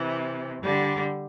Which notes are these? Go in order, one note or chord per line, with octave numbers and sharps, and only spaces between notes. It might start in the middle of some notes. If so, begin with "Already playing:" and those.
Already playing: C3 E3
D3 G3